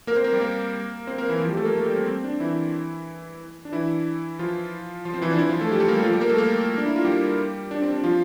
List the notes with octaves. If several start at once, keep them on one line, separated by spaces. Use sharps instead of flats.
A#3 A#4
C4 C5
A#3 A#4
G3 G4
A#3 A#4
C4 C5
A#3 A#4
E3 E4
F3 F4
G3 G4
A3 A4
A#3 A#4
A3 A4
G3 G4
C4
C4
D4
E3 E4
D4
E3 E4
F3 F4
F3 F4
C4 C5
E3 E4
D4
E3 E4
F3 F4
A3 A4
G3 G4
A3 A4
A#3 A#4
G3 G4
F3 F4
G3 G4
A#3 A#4
A3 A4
A#3 A#4
D4
E4
F4
G3 G4
D4
C4
D4
F3 F4